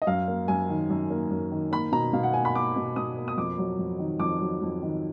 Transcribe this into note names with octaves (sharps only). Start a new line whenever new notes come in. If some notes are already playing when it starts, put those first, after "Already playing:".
D#5
F#2 F5
A#3
F#2 G#5
D#3
F#2
A#3
F#2
D#3
A#3 B5
B2 A#5
B2 F5
F#5
A#3 G#5
B5
A#3 D6
B2
B2 D#6
A#3
D#6
F2 D6
F#3
F2
D#3
F2 D6
F#3
F2
D#3